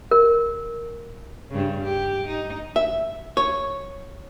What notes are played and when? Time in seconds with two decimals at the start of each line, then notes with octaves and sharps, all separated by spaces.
0.11 A#4
1.50 G2 C#3
1.83 G4
2.27 D#4
2.76 E5
3.37 C#5